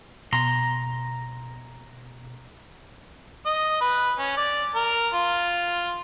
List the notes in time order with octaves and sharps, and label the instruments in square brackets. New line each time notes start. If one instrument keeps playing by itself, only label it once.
[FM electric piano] B2 [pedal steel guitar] A#5 C6
[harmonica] D#5
B4
C#4
D5
A#4
F4